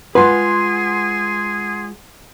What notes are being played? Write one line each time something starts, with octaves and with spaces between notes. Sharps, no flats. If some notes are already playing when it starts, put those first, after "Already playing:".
G#3 F4 G#4 B4 F#5 G#5 C6